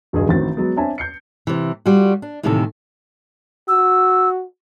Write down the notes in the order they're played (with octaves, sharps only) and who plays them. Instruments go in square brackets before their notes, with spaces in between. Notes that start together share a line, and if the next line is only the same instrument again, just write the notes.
[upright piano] D#1 A#1 G2 F#4 G#4 D#5
A1 D#3 C4 F#4 A6
F#3 G#3 B3
C4 D4 C#5 E5 G#5 A5
G6 C7 C#7
[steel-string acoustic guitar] C3 E3
G3 F4 F#4
D4
D#2 A2 C3 D#3 E3 A4
[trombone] F#4 [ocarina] E6